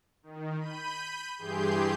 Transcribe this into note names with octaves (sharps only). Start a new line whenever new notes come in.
D#3
B5 G6 D#7
G2 E3 G4 G#4 C6 G6